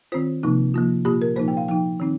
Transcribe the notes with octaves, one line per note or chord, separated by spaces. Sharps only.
D#3 C4 F4 C5
C3 F3 A#3 D#4
F3 A#3 F4
A#2 A#3 F4 G4
A#4
A#2 F3 A#3 D#4 C5
G5
F5
F3 D#4 G5
D#3 C4 D#4